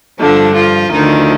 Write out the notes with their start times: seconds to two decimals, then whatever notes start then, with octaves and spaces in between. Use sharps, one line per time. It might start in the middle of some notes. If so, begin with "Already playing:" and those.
0.20 G2 D3 F3 D4
0.55 F3 F4
0.91 D2 D3 D#3 F3 D#4